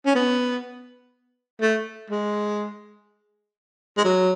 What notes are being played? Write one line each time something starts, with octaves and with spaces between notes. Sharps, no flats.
C#4
B3
A3
G#3
G#3
F#3